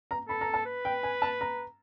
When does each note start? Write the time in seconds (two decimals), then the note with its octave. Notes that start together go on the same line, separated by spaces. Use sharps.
0.11 A#5
0.28 A4 B5
0.41 A#5
0.54 A5
0.66 B4
0.85 G5
1.03 G#5
1.22 A5
1.41 A#5